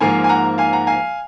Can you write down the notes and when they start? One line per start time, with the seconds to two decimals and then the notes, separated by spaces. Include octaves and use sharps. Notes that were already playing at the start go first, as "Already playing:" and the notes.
0.01 G#2 F3 A#3 F5 G#5
0.24 G#5
0.29 F#5 A#5
0.58 F5 G#5
0.73 F#5 A#5
0.87 F5 G#5